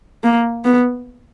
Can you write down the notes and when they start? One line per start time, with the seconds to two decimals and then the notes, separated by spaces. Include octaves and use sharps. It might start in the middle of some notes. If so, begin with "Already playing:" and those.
0.24 A#3
0.65 B3